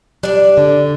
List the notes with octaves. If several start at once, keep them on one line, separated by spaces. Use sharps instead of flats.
G3 D4 D5
D3